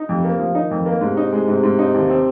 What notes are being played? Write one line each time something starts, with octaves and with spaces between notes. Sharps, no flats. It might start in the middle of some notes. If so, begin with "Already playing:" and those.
Already playing: D#4
F2 C3
A#3
F3
D#3 D#4
F2
A#3
G#2 C3
D#4
G#3
G#2 C3
G#2
D#4
D#2
C4